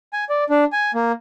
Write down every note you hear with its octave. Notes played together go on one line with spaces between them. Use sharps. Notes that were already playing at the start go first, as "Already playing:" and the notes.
G#5
D5
D4
G#5
A#3